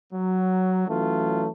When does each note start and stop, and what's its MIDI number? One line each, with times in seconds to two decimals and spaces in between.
0.13 0.88 54
0.88 1.47 52
0.88 1.47 54
0.88 1.47 57
0.88 1.47 61
0.88 1.47 65